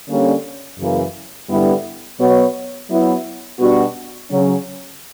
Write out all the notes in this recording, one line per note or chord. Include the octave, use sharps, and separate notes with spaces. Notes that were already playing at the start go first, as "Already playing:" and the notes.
D3 G3 A#3 C#4
F#2 C#3 E3 A#3
G2 D3 G3 B3 E4
B2 F#3 B3 F#4 C#5
F#3 B3 E4
B2 G3 B3 D4 F#4
C#3 F#3 C#4